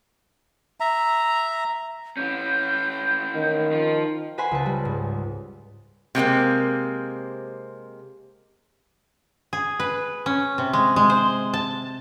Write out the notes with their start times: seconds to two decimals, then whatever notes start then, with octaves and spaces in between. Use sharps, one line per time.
0.80 E5 A#5
2.17 E3 C#4 G6
3.35 D#3
3.72 F3
4.38 B4 C5 F#5 G#5 C6 B6
4.51 C#2 A5
4.66 G3
4.85 G#2
6.15 C3 G#3 A#3 C4
9.53 G#4
9.80 B4
10.26 C#4
10.58 C3
10.73 G#3
10.96 G#3
11.10 C5
11.54 A5